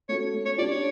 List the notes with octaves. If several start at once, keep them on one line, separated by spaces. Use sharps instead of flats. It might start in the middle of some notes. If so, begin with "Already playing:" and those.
A3 C#4 F#4 A4 C#5
A3
C#5
D4 G4 D5
C#5